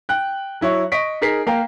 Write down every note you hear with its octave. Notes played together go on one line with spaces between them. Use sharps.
G5 F#6
F#3 E4 C#5 C#6
D#5 C#6 B6 D7
D#4 G#4 A#4 B6 C7
A#3 F5 G5 A#5